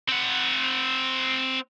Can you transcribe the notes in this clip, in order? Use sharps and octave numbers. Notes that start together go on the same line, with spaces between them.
C4 F#5